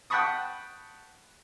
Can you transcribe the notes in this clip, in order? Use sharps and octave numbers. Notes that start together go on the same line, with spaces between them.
F#5 G5 A5 B5 C#6 D#6